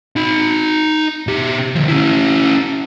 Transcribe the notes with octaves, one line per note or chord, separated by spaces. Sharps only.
D#4 B5
B2 G4
D3 F3
C#4 E4